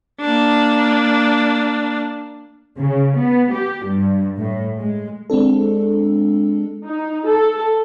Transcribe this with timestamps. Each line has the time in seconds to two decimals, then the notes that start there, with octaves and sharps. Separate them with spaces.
0.21 A#3 D4
2.79 C#3
3.18 B3
3.52 G4
3.84 G2
4.38 A2
4.79 G#3
5.30 G#3 C4 D4 A4
6.86 D#4
7.27 A4